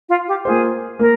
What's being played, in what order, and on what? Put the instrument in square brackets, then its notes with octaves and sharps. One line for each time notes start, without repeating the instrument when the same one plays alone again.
[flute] F4
G4
[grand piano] A#3 F4 C5 [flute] G#4
[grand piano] A#3 [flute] A#4